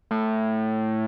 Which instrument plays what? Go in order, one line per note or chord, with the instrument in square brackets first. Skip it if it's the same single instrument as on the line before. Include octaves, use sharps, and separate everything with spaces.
[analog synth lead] A2